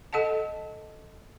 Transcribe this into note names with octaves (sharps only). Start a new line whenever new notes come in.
A4 D#5 F#5 A5